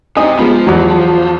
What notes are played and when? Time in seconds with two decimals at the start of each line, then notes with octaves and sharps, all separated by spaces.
0.17 C3 D#4 G#5 D#6
0.39 F3 G#3 B3
0.67 E2 F#3